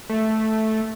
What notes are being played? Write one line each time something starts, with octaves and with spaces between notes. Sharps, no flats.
A3